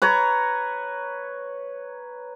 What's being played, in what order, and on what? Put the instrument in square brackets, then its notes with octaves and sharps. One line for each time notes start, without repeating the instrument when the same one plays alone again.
[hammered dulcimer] B4 C#5 A#5